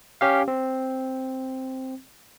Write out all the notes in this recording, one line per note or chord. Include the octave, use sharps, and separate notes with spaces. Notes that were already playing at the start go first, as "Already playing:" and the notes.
C#4 G4 F5
C4